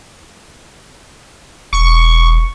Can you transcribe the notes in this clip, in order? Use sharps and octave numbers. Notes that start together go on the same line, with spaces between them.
E1 C#6